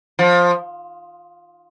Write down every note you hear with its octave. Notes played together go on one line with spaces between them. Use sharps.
F3